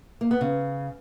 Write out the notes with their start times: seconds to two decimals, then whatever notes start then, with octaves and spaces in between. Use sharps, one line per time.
0.21 A#3
0.31 B3
0.41 C#3